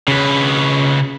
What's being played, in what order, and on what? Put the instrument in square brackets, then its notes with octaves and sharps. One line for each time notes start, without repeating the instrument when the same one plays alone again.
[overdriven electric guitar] C#3 B4